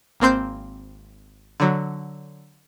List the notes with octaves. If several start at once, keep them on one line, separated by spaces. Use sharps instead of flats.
G#1 A#3 C4 C5 G6
D3 F#3